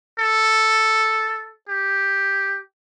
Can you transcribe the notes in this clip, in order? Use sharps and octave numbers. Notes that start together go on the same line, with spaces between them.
A4
G4